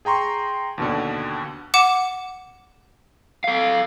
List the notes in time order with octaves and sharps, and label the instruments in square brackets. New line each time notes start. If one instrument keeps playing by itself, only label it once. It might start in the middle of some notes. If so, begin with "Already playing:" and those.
[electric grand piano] G#4 G5 A#5 C6 C#6
D#2 B2 D3
[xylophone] F#5 D6 E7
[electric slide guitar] A4 F5